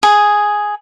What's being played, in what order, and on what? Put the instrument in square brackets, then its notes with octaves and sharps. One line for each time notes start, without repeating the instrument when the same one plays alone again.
[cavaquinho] G#4